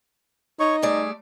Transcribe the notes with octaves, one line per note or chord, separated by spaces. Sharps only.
D#4 C#5 C#6
G3 A3 G#4 D5